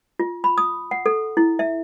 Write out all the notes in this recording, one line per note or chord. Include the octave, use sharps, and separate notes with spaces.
F4
B5
D#6
F#5
A4
E4
E5